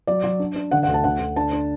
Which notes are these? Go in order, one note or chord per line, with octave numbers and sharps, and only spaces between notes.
F#3 D5
F#3
D4
D4
D3 F#5
F#5
D2
A5
D2 F#5
D2
D4 A5
D4